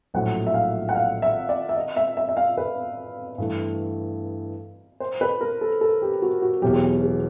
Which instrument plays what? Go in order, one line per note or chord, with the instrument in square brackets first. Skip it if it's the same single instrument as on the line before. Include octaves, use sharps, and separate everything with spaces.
[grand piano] A#1 A2 F#3 A3 [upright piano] F#5
[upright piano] E5
F5
F#5
F5
E5
D5
E5
D#5
E5
E5
E5
F5
B4
[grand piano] G2 E3 A3
[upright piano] C5
B4
A#4
A4
A4
G4
F#4
F#4
[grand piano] E1 E2 B2 F#3 [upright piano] G4
[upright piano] G#4
G4
G#4